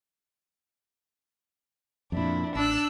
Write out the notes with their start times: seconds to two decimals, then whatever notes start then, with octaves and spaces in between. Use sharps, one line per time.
2.12 F2 A#2 D4 E4
2.55 A1 D4 E6 F#6